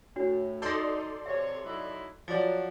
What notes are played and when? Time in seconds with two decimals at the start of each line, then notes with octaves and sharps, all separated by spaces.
0.16 A2 D4 F#4 C#5
0.62 D#4 A4 D5 C6 G6 A#6
1.26 C3 C#5 E5
1.64 F#3 D#4 E4
2.28 F3 F#3 D5